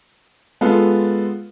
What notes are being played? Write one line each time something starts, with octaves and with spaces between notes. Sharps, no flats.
G#3 B3 F4 A4